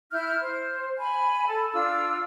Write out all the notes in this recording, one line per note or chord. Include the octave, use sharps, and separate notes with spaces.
E4 F6 G6
C5
G#5 B5
A4 A5
D4 F4 E6